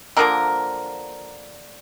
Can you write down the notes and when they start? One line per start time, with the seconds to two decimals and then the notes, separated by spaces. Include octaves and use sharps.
0.17 D3 F3 A#3 A#4